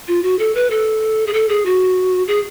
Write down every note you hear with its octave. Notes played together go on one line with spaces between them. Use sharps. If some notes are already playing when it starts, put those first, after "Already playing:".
F4
F#4
A4
B4
A4
G#4
A4
G#4
F#4
G#4